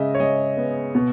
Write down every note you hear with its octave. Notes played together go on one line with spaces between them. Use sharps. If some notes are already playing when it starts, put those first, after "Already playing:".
Already playing: C#3 G#3 D#5 E5
C#5
G#3 D#5
B3
B2